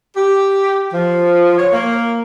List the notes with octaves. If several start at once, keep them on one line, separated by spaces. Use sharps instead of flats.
G4
F3
C#5
A#3